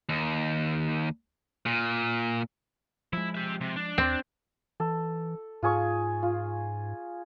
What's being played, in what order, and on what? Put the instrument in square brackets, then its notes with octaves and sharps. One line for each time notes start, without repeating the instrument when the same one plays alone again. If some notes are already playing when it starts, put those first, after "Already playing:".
[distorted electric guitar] D#2
A#2
[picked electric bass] F3 G#3 [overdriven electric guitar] E4
[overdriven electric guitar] G4 E5
C3
D4
[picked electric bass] D#2 [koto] C4
[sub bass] E3 [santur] A4
[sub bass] G#2 [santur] F4 G#4 C#6
[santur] F4